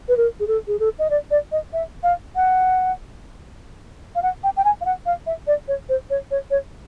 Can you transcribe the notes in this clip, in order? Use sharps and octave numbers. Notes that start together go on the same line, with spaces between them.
B4
A#4
G#4
A4
G#4
A4
D#5
D5
D5
D#5
E5
F5
F#5
F5
F#5
G5
G5
G#5
F5
F#5
F5
E5
D5
C#5
C5
C#5
C#5
C#5